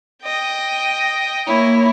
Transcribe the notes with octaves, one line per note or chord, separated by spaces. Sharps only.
D#5 G5
A#3 E4 C#5